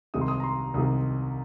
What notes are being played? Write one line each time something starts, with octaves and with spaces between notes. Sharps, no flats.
C2 C3 D#3 G#3 D#4 D#6
C6
D#6
A#5
C6
C2 C3 D#3 G#3 D#4 D#6